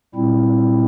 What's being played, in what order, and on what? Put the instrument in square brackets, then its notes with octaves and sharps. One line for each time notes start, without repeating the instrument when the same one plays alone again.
[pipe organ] A#2 G3 C4 E4